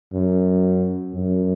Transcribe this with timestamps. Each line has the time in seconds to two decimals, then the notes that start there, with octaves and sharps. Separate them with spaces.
0.13 F#2
1.15 F#2